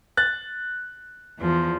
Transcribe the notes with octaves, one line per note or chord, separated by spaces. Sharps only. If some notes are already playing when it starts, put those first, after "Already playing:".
F#6 A6
E2 F3